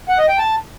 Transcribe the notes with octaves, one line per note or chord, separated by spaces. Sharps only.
F#5
D#5
G5
A5